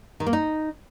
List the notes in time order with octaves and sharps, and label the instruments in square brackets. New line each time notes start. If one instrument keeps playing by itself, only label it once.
[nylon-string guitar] D#3
A#3
D#4